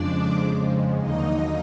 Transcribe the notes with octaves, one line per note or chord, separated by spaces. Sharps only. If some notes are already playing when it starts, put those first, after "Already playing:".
Already playing: F2 C#3 F3 G#3 D4 D5
D#2 D3 F#3 A#3 D#4 D#5